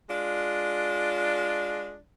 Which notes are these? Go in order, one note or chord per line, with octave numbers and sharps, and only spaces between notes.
G#3 D4 F4